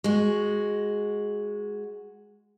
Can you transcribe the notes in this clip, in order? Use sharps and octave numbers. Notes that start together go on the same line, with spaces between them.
G#3 F#4